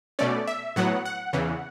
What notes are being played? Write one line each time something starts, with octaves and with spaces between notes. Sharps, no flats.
B2 A3 C#4 D5
E5
A2 F#3 B3 F#5
F#5
E2 C#3 E3